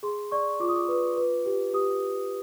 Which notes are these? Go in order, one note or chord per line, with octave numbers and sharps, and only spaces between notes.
G#4 C6
D5 C#6
F4 D6
D#6
D6
B4
B4
G4
G4 D#6